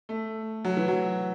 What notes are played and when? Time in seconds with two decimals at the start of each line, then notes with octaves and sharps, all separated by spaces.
0.09 A3
0.65 F#3
0.77 E3
0.88 F#3